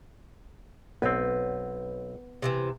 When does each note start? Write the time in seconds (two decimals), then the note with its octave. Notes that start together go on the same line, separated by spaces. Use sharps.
1.02 B1 B3 C4
2.42 C3 D#3 E3